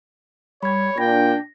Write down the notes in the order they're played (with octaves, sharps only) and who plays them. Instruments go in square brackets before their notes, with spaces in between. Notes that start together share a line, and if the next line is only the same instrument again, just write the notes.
[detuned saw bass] G3 [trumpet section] C#5 [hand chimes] B5 G#6
[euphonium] A#2 [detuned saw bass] D4 [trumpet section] G5 [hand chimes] A#6